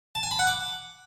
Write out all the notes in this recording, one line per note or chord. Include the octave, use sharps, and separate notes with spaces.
A5
G#5
B5
F#5
D6